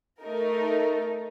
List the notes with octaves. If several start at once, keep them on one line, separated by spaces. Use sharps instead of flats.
A3 D#4 A#4